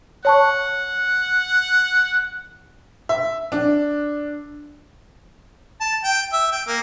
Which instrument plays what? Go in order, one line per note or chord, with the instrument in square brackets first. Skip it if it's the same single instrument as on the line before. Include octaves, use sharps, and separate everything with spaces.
[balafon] C#5 A5 C#6 [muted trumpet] F#5
[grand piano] E5
D4
[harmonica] A5
G5
E5
G5
A#3